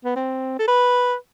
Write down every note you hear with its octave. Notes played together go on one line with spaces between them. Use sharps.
B3
C4
A4
B4